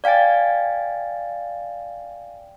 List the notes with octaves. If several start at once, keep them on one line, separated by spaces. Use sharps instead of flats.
D5 F5 G5 G#5 A6